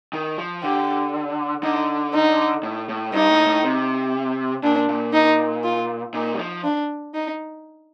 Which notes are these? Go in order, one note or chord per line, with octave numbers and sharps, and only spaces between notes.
D#3
F3
D3 G4
D3 D#4
D#4
A2
A2
G2 D#4
A2
A2
C3
A#2 D4
A#2
D#4
F4
A#2 D#4
G3
F3
D4
D#4